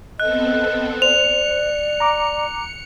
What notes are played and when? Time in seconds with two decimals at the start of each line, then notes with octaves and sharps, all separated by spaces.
0.20 B3 C4 A4 D#5 F#6
1.02 C5 D5 C#7 F7
2.00 A#5 D6